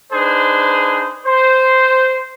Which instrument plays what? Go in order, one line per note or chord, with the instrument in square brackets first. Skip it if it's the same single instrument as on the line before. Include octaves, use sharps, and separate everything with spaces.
[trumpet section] D4 D#4 G#4 B4 C5
C5